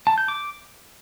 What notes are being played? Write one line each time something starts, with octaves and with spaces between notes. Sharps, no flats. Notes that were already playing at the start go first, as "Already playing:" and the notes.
A5
G6
D6